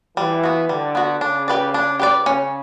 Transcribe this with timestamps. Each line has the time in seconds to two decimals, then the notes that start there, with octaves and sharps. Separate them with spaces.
0.17 E3 G3
0.44 B3 F#4
0.69 D3 G3
0.95 B3 F#4
1.21 C#3 D4
1.48 G4 B4 D5
1.74 D4
2.00 G4 B4 D5
2.26 C#3 C#4